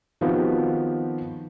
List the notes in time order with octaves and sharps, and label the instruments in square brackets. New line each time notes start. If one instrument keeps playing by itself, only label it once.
[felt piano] D#3 F3 B3 C4 F#4 G4